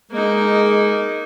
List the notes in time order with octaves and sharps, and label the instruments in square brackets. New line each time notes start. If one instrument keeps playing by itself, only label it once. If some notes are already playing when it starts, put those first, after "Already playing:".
[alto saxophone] G#3 [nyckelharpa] A#3 D#4